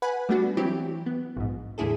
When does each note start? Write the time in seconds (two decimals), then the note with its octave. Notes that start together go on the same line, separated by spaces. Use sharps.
0.02 B4 F#5 G#5 B5
0.29 G3 A3 B3 D4 F#4
0.57 E3 F#3 C4 E4 G4
1.06 B3
1.37 A#1 G#2
1.78 E2 A2 D3 E4 G#4 A4